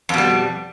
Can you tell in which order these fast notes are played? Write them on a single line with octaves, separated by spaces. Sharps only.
F2 B2 G3